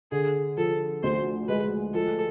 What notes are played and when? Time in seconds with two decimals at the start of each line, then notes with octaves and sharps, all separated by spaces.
0.12 D3 G#4
0.57 F3 A4
1.04 D2 C5
1.48 G#3 B4
1.94 F3 A4